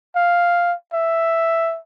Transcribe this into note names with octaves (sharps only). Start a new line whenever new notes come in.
F5
E5